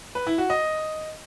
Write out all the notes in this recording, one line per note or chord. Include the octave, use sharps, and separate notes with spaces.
B4
E4
F#4
D#5